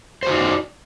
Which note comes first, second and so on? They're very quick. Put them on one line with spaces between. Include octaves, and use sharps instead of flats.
C5 F#4 D#4 D5